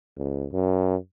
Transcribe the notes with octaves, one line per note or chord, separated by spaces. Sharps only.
C#2
F#2